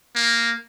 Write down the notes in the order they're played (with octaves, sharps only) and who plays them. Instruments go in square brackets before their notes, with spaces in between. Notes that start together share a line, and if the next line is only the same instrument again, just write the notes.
[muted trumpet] A#3